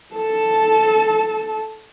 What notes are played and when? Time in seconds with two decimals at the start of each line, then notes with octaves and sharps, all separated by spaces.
0.15 A4 A5